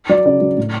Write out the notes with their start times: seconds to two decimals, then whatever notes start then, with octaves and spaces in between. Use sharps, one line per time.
0.09 F#3 D5
0.25 C#3 D5
0.41 F#3
0.58 A2